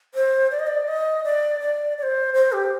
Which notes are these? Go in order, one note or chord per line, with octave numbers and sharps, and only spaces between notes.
C5
D5
D#5
D5
D#5
D5
D5
D5
C5
C5
G4